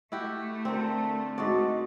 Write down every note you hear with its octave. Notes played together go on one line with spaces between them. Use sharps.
A3 E4 F#4 G4
D3 C4 A#4
G#2 F#4 D5 D#5